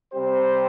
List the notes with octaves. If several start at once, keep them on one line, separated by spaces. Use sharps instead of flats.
C3 G3 C4 G4 C5